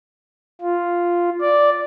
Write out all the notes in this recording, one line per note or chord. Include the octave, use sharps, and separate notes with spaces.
F4
D5